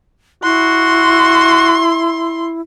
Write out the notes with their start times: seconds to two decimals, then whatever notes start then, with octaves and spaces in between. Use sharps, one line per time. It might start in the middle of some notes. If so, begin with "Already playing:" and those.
0.44 E4 F#4 C6